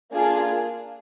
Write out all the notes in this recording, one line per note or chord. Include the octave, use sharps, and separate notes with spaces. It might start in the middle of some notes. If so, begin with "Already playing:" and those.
A#3 D4 F4 G#4